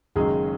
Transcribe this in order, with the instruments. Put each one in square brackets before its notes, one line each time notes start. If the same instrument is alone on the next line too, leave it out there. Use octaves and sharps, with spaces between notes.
[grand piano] F#1 F#2 D#3 F#3 G#3 G#4